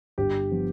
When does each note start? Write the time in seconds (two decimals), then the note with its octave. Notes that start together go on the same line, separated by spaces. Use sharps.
0.18 G1 G4
0.51 F3 B3